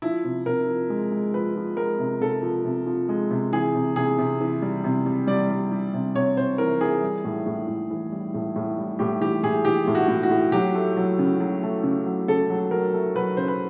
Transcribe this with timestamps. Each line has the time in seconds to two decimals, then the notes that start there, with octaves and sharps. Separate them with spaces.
0.02 F3 E4
0.24 C3
0.46 C3 A#4
0.68 F3
0.90 G#3
1.12 G#3
1.33 F3 B4
1.56 F3
1.77 G#3 A#4
1.99 C3
2.21 C3 A4
2.42 F3
2.65 C3
2.86 F3
3.09 G#3
3.31 C3
3.52 E3 G#4
3.75 C3
3.96 C3 G#4
4.18 C3
4.41 E3
4.62 G3
4.84 C3
5.06 G3
5.27 G3 D5
5.50 G3
5.72 G3
5.94 C3
6.15 C3 C#5
6.37 C3 C5
6.58 E3 A#4
6.81 E3 G#4
7.03 G3
7.25 A2
7.46 A2
7.68 A2
7.91 E3
8.12 G3
8.34 A2
8.56 A2
8.78 G3
8.99 A2 G4
9.21 E3 G4
9.43 A2 G#4
9.65 E3 G4
9.87 A2
9.95 F#4
10.08 A2
10.23 F#4
10.30 A2
10.52 F#3 G4
10.75 A3
10.97 F#3
11.19 C#3
11.40 F#3
11.63 A3
11.84 C#3
12.06 F#3
12.28 C#3 A4
12.50 F#3
12.71 F#3 A#4
12.93 A3
13.15 F#3 B4
13.37 C#3 C5
13.48 B4